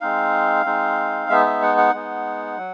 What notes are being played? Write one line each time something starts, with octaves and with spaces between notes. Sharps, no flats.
G#3 C4 D#4 F5
G#3 C4 D#4
G#3 B3 D#4 E5
E5
F#5
F#5
G#3 B3 D#4
F#3